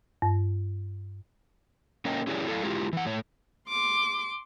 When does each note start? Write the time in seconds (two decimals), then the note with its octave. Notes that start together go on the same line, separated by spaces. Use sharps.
0.22 G2
2.05 A#3 C#4 A#4 C#5 D#5 G5
2.27 C#4 E4 G4 G#4 C#5 D5
2.47 E4 A4 D5 F5
2.63 G#3 E4 F4 G4
2.93 E3 F#5
3.06 A2 C#5
3.69 C6 D6